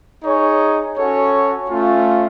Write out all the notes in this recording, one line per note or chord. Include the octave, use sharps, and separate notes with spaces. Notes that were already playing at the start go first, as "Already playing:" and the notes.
D#4 G#4 C#5
C#4 F#4 A4 C#5
A3 C#4 F4